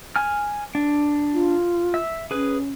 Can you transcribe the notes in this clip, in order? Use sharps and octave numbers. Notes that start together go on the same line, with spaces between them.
G#5 F6
D4
F4
E5
C#4 G#4 B4